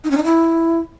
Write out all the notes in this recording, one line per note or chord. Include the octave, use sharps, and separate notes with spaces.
D#4
C#4
D#4
E4